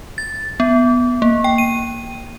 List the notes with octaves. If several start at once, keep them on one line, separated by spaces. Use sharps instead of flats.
A6
B3
A#3
G5
D#7